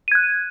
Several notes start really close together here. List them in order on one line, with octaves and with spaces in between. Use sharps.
D#7 G#6 F#6